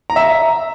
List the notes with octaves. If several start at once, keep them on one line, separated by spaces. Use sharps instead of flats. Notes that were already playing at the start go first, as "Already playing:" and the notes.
A#5
E5
A#5